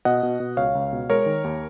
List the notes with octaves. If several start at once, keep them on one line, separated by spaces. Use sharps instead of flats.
B2 D#5 F#5
B2
B2
C#2 C#5 F5
C#2
B2
G#3 A#4 C#5
D#3
D#2